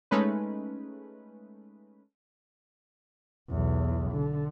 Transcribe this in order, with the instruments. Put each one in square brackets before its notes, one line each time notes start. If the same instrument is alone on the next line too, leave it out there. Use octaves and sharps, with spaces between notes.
[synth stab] G#3 A3 C#4 D#4 B4
[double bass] B1 E2
D3